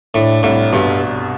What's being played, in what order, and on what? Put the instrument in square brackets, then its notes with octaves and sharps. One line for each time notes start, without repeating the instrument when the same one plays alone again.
[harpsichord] A2 [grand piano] D4
[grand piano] C2 [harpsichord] A2
[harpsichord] G2 [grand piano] B2